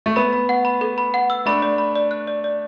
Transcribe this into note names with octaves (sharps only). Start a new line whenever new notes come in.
A3
B3 B5
B5
F#5
B5
A4
B5
F#5
E6
A3 D4 B5
D5
B5
D5
F#6
D5
D5